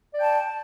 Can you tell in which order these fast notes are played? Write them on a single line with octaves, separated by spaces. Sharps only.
D5 G5 A5